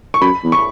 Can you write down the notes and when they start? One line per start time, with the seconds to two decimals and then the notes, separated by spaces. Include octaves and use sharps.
0.14 C#6
0.21 F#2 B5
0.44 E2
0.52 C#6